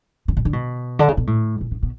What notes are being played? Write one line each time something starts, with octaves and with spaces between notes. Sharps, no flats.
C#3
B2
D3
B2
D3
C#3
B2
A2
B2
C#3
B2